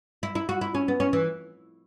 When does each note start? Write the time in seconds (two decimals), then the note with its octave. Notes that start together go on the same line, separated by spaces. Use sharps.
0.23 E4
0.35 E4
0.49 F#4
0.61 E4
0.75 C#4
0.88 B3
1.00 C#4
1.13 E3